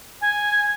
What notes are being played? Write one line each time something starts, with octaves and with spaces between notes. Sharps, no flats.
G#5